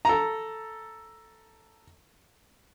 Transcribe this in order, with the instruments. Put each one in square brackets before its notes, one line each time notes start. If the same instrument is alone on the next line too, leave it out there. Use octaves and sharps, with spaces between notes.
[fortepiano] A4 A#5